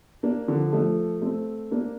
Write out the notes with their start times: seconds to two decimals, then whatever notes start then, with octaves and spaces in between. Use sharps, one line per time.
0.23 A#3 D4
0.48 D3 F3
0.72 F3 A3
1.22 A3 C4
1.71 A#3 D4